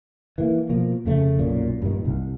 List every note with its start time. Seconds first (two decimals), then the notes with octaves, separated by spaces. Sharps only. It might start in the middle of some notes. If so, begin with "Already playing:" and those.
0.38 E3 A#3
0.69 B2 F3 A#3
1.05 F1 C#3 A3
1.39 B1 F#2 A#2
1.82 G2 A#2 D#3
2.05 C2